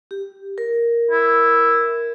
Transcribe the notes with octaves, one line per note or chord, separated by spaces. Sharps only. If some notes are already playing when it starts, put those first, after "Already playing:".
G4
A#4
E4